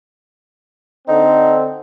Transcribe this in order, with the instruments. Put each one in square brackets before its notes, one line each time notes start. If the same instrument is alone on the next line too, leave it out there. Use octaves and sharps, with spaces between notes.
[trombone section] D3 C4 [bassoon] D#4